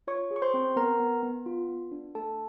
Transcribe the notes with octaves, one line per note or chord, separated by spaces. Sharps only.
F4 C#5 C#6
G#4
C#6
C5 C6
C4
B3 A#4 A#5
B3
B3
F4
B3
D4
A3 A4 A5